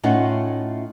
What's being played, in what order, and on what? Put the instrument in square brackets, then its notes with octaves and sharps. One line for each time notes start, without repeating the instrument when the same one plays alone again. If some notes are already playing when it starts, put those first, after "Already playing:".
[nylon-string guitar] A2 A3 C#4 D#4 F4 F#5